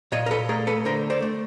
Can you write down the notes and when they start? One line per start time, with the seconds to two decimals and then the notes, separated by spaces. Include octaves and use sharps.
0.12 A#2 C#5 D#5
0.26 A#4
0.31 A4 B4
0.49 A3 G#4 A#4
0.67 A4 B4
0.85 D3 A#4 C5
1.10 C5 D5
1.22 A3